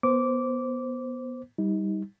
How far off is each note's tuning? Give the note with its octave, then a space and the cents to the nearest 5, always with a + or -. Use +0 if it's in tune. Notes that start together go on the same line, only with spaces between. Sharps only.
B3 -15 C5 +0 D6 -15
G3 +0 D#4 +30